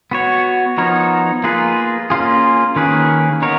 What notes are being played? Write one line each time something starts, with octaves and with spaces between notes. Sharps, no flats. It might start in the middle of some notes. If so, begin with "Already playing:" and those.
B3 F#4 C#5
F3 B3 D#4 A#4 C#5
A#3 F4 G#4 B4
A#3 C#4 F4 G#4
D#3 A#3 C#4 G#4 B4
B3 D#4 A#4 C#5